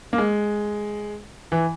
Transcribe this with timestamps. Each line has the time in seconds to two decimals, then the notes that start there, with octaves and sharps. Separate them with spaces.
0.13 A#3
0.18 G#3
1.52 E3